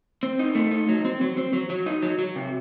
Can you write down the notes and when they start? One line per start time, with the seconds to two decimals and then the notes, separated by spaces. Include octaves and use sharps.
0.23 C4
0.39 D#4
0.55 A3
0.71 D#4
0.89 F#3
1.05 C4
1.21 F#3
1.37 C4
1.53 F#3
1.70 F#3
1.86 D#4
2.02 F#3
2.19 F#3
2.36 C3